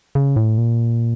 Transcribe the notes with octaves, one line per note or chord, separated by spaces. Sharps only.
C#3
A2
A#2